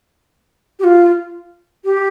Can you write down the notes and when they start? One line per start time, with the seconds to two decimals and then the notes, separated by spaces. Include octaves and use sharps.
0.79 G4
0.83 F4
1.84 G4